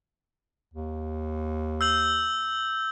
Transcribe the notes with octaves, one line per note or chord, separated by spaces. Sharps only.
D#2
E6 G6 F#7